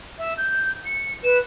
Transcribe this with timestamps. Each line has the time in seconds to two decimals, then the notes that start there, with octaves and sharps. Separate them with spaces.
0.19 E5
0.38 G6
0.86 C#7
1.24 B4 E7